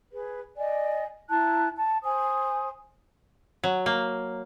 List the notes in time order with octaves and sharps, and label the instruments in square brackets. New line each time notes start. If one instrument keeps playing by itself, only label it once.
[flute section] G#4 B4
D5 D#5 G#5
E4 A5 A#5 F#6
A5
C5 G#5 D#6
[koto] F#3
A#3